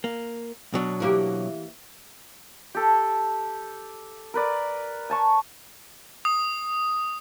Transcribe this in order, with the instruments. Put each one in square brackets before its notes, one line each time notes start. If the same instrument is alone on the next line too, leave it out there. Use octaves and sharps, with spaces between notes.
[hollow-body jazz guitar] A#3
B2 F#3 D4
[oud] E3 A#3 G4
[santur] G4 A4
A#4 B4 D5
G#5 A5 C#6
[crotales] D#6